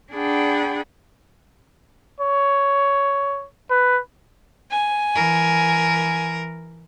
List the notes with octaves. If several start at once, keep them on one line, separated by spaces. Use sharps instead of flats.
D4 G#4 D5 F#5 G5 B5
C#5
B4
G#5
E3 A#4